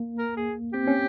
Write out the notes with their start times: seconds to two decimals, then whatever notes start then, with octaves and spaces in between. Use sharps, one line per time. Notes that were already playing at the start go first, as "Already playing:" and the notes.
Already playing: A#3
0.19 A#4
0.37 G#4
0.73 C4 G4
0.87 C#4